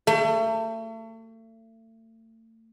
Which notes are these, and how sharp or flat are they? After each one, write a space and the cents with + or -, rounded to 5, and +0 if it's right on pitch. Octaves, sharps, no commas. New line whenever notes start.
A3 +35